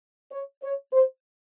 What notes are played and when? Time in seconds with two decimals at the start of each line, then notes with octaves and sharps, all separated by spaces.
0.31 C#5
0.62 C#5
0.93 C5